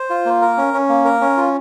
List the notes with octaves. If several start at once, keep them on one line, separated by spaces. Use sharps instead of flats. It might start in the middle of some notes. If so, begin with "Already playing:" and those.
Already playing: C5
F4
A#3
A#4
C#4
C#4
A#3
A#4
C#4
F4